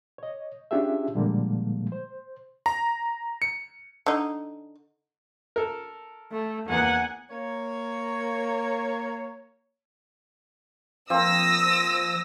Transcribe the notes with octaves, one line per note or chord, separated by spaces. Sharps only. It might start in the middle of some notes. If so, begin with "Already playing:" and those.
C#5 D#5
C#4 D4 F4 G4 G#4 E5
A#2 D3 F3 G3 G#3 A#3
C5
A#5
C#7
D3 D#4
A4 A#4
A3
E2 A#3 B3 F#5 G#5
A#3 C#5
F3 A#3 C4 D#6 E6 A#6